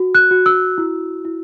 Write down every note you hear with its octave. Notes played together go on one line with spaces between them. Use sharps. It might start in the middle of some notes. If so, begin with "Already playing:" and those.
Already playing: F#4
F#6
F#4
E6
E4
E4